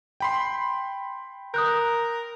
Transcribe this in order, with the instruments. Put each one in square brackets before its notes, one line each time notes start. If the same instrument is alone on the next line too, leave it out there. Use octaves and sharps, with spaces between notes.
[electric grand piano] G5 B5 C6
[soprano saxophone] A#4 [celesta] D#6 F#6 G6